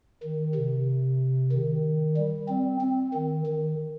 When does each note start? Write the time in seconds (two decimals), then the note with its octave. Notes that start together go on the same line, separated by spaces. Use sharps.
0.23 D#3
0.55 C3
1.52 D#3
2.17 G3
2.49 C4
2.81 C4
3.14 D#3
3.46 D#3